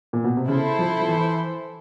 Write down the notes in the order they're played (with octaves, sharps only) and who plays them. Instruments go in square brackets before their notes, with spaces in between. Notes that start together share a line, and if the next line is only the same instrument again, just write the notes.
[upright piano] A#2
B2
C3
[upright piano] C#3 [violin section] E4 A4 C5
[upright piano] F3
F3
E3